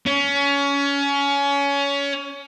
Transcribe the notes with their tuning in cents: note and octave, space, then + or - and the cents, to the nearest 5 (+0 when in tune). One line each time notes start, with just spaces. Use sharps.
C#4 +25